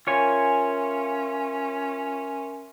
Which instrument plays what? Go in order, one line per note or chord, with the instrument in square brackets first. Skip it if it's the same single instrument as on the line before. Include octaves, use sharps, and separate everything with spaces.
[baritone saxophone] C#4 [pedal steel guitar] F4 C#5 G#5 [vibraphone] A#4 E5 C6